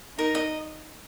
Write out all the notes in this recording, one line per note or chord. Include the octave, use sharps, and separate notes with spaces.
D#4 A#4
D#5